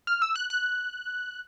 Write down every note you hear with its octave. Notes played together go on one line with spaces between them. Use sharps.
F6
E6
F#6
F#6